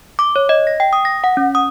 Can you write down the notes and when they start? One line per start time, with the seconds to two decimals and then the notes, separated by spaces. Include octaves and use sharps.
0.19 D6
0.36 C#5
0.49 D#5
0.67 A#6
0.80 G5
0.93 D#6
1.05 A#6
1.24 F#5
1.37 C#4
1.55 D#6